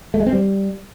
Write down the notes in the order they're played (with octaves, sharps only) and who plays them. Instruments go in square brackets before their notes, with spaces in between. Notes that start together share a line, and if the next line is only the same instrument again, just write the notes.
[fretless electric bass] A3
G#3
C4
G3